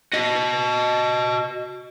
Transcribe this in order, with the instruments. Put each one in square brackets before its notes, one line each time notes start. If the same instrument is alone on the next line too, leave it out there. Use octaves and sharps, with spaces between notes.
[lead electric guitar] F#4 D#5